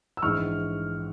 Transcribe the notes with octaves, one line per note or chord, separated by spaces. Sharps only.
E6
A#1 G#2 E3 C#6 F6